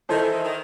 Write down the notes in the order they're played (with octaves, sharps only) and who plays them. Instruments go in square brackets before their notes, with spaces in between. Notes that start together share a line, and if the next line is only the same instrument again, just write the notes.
[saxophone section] D#3 [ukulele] E4 A4 C5
[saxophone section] E3
D#3
D#3